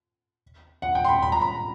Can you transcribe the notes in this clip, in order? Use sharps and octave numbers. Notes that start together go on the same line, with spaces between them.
F#5
G5
C6
B5
B5
A#5
B5